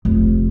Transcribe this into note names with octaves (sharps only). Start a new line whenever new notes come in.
F1